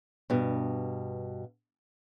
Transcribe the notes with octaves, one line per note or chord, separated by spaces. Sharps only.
G2 B2